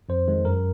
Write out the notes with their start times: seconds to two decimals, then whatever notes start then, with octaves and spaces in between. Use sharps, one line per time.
0.09 F2 C5
0.28 D#3 G#3
0.45 F#2 A#4